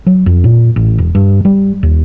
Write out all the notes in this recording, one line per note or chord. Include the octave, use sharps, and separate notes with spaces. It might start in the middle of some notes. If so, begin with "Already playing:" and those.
F#3
F2
A#2
A1
E1
G2
G3
D#2